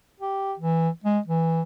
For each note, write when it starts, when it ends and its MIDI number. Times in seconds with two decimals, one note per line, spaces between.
0.20 0.54 67
0.59 0.89 52
1.04 1.19 56
1.27 1.62 52